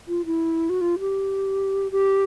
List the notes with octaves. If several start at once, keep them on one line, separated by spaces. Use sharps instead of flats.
F4
E4
F#4
F4
G4
G4